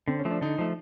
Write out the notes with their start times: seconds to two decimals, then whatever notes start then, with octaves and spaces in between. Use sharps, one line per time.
0.08 D3 C4
0.19 C#4
0.25 F3 A3
0.31 D4
0.41 D3 D#4
0.58 F3 A3